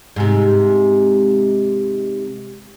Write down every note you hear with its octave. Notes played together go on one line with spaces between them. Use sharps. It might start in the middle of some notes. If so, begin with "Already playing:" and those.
G#2 C3